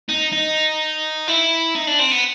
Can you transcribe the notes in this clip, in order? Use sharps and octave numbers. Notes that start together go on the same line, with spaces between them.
D#4
D#4
E4
D#4
D4
C4
B3